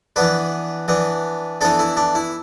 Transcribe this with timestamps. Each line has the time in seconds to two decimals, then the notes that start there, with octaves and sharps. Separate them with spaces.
0.16 E3 B3 D4 B4
0.88 E3 B3 D4
1.61 E3 B3 D4 A4
1.79 E4
1.97 D4
2.15 E4